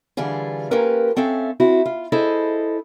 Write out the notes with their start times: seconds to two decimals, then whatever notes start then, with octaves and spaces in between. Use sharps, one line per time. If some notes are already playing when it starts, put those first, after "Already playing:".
0.17 D3 E3 G3 F4 G#4
0.71 A#3 C#4 F4 G4 A#4 B4
1.17 C4 C#4 A4 E5 F5
1.60 C4 E4 F#4
1.85 F4
2.12 E4 G#4 A4 C5 D#5